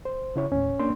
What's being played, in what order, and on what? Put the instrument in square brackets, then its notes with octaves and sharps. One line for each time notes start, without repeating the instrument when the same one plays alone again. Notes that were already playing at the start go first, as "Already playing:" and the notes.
[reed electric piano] C5
C#3 E4 C#5
[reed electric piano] D#2 A2 [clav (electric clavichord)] C#4
[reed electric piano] A#3 D4 C6